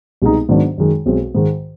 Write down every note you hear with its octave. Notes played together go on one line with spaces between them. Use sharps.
C2 B2 G#3 B3 D#4
G#2 D#3 F#3 B3 D4
F#2 D#3 G#3
B1 B2 G#3 C4
G#2 D#3 G#3